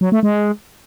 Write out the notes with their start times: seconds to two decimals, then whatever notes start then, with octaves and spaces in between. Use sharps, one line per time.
0.01 F#3
0.12 A3
0.23 G#3